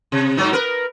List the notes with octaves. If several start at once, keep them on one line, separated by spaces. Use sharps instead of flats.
C3
G#2 F#3 D#4
A#4 B4